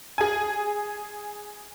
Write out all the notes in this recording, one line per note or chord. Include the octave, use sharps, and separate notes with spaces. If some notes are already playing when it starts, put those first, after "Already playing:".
G#4 G#5